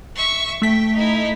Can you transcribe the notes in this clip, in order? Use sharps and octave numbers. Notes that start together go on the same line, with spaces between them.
E5 C#6
A3 G5 B6
D#4 E4